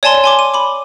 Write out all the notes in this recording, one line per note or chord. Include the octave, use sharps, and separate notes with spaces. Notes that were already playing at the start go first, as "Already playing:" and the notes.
C#5 D5 G#5 A5 C6
G#5 C6 D6
D#7
B5 D6